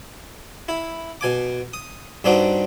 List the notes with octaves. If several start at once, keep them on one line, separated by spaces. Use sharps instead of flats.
E4
B2 G#5 D6
D#6
G2 C4 D4 D#4 F#4